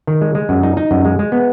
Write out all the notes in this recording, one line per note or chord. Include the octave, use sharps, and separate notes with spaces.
D#3
G#3
G#3
F#2
D#4
D#4
F#2
G#3
G#3
B3